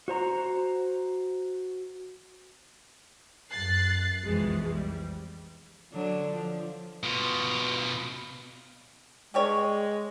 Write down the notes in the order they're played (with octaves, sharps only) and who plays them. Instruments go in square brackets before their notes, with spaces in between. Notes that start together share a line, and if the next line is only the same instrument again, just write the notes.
[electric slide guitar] F#4 C5 A#5
[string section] F#2 F#6 A6 C7
B1 F2 B2 E3 G#3
G3
[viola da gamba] D3 F#3 D4
F3
[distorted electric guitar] B2 F4
[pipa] G3 G4 C#5 [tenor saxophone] G#3